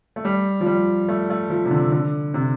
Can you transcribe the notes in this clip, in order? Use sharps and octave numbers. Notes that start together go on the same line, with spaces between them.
A3
G3
F3
G3
A3
A3
F3
C3
D3
D3
C3